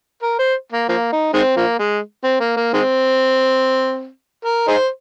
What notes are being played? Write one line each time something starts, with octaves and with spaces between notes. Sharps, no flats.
A#4
C5
A#3
F3 A#3
D#4
D#3 G#3 C4
F3 A#3
G#3
C4
A#3
A#3
D#3 G#3 C4
A#4
D#4 G#4 C5